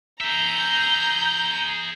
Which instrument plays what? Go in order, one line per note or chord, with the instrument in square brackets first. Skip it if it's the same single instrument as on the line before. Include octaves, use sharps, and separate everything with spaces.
[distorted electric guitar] G#4 E5 [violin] A#5 G6